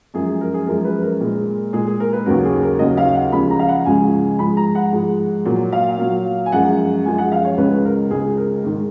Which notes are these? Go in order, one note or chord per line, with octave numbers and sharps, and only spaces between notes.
F#2 F3 G#3 G#4
G#4
A#4
G#4
F#2 F3 G#3 A#4
B4
A#4
A#2 G#3
A#2 G#3 G#4
G#4
A#4
B4
D#2 C#3 F#3 A#4
G#4
A#4
D#2 C#3 F#3 D#5
F5
F#5
C#2 C#3 F3 G#3 B5
A#5
F5
F#5
C#2 C#3 F3 G#3 G#5
G#2 F3 G#3 B5
A#5
F#5
G#2 F3 G#3
A#2 F#3
F5
A#2 F#3
G#5
F#2 F3 G#3 F#5
F#2 F3 G#3 G#5
F#5
F5
C#5
C#2 C#3 G#3 B4
A#4
C#2 C#3 G#3 G#4
A#4
G#2 D#3 G#3